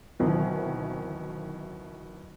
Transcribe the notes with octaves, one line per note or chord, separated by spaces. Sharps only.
D2 B2 D#3 E3 F#3 C4